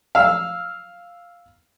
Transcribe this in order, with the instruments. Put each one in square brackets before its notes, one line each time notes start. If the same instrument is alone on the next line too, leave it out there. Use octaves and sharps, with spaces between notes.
[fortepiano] F5 E6